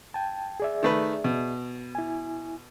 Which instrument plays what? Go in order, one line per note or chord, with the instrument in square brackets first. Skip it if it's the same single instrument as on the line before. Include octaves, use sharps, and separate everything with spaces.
[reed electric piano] G5 A5
G#4 D5 E5
[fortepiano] D#3 A3 B4
B2
[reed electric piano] E4 G#5